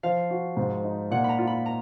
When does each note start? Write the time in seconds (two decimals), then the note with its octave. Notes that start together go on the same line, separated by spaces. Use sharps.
0.03 F3 F5
0.31 F#4
0.57 G#2
0.84 D#4
1.11 A#2 F#5
1.24 B5
1.29 A#5
1.39 F4
1.47 B5
1.66 A#5